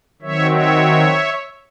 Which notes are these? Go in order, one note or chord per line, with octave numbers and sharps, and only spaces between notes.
D#3 F#3 C4 C#5 E5
C#5 E5